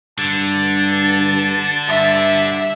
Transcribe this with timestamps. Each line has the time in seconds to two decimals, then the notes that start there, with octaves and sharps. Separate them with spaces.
0.18 G2 D3 A5
1.88 G2 E5